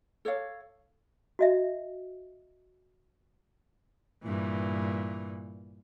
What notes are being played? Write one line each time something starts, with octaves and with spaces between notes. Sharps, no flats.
A4 C#5 D5 F5
F#4 D#5 E5
G2 A#2 E3